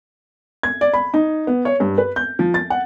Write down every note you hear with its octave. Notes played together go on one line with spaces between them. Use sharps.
G#6
D5
B5
D#4
B3
C#5
G2
B4
G6
F3
A6
F#5